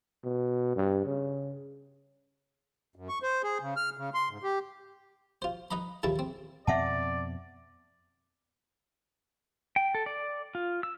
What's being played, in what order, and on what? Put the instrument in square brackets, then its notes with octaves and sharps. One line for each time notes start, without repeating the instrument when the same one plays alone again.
[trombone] B2
G2
C#3
[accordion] F#2
C#6
C5
G#4
C#3
F6
C#3
C6
G#2
G4
[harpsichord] F4 C5
D#4 B4 D#5 A#5 B5
D#2 A#2 C#3 E3 E4 A5
C4
[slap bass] F2 B2 C4 [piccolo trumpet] D5 [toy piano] E5 F#5 A5
[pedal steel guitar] G5
A4
D5
F4
E6